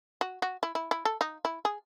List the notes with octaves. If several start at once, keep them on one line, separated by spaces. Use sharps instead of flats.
F#4
F#4
E4
E4
E4
A4
D#4
E4
G#4